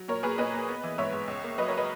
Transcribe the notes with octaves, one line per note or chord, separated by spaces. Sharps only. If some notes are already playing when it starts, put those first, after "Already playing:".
Already playing: F#3
A#2 A#4 C#5
A#2 G#4 B4
A#2 B4 D#5
A#3
B3
E3
G#2 C#5 E5
G#2
C#2
A#3
F#3 B4 D#5
A#4 C#5
B4 D#5